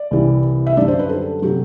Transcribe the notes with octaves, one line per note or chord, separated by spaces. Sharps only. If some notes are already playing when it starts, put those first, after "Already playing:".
Already playing: D5
C2 C3 E3 G3
E5
F#2 D3 G3 D5
C5
B4
A4
C3 F#3 G4